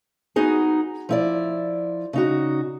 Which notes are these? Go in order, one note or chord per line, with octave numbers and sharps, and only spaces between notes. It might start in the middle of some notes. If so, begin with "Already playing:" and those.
B3 D#4 F#4 G#4
F3 E4 D5
C#3 D#4 F#4